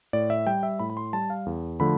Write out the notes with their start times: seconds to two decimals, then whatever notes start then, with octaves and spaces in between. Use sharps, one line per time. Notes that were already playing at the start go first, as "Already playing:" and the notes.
0.13 A2 D5
0.30 E5
0.47 G3 G5
0.63 E5
0.79 A2 B5
0.90 B5
0.97 C6
1.13 G3 A5
1.30 F5
1.46 E2
1.80 D3 F3 A3 B5